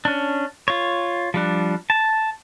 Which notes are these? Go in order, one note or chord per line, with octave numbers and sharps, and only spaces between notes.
C#4 D4
F4 C#5
F3 G3 D4
A5